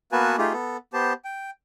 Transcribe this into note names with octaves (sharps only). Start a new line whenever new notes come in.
A#3 B3 F#4 B4 G#5 A5
A3 D#4 F4 G4 G#4
B3 A4
B3 G4 C5 A5
G5